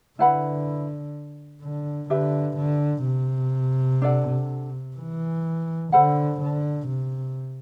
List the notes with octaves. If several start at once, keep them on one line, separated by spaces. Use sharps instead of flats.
D3 E4 B4 F#5 B5
D3
D3 G4 B4 E5
D3
C3
D4 A4 D5 F#5
E3
D3 A4 C5 F#5 B5
D3
C3